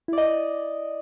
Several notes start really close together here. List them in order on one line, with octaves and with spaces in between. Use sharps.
E4 D5 D#5